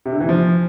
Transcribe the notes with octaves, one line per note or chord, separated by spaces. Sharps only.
C3
D3
E3
F3